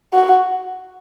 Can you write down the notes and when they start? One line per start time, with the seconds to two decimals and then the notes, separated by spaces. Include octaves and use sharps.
0.13 F#4